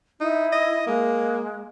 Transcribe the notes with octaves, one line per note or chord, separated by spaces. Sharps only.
D#4 E4
D#5
G#3 A#3